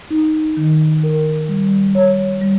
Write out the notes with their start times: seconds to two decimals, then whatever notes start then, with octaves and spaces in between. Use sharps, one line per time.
0.10 D#4
0.57 D#3
1.03 A#4
1.48 G3
1.95 C#5
2.42 G3